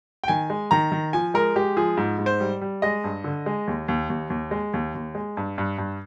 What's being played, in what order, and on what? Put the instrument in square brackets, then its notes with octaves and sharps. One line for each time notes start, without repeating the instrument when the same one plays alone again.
[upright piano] G5
D#3 G#5
G#3
D#3 A#5
D#3
F3 G#5
G#3 A#4
G#3 G4
F3 G#4
G#2
G#2
C5
G3
G3
G#3 D#5
G2
D3
G#3
D#2
D#2
D#2
D#2
G#3
D#2
D#2
G#3
G2
G2
G2